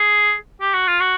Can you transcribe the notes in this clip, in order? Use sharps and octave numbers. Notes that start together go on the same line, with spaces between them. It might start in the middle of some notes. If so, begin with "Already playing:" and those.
Already playing: G#4
G4
F#4
F4
F#4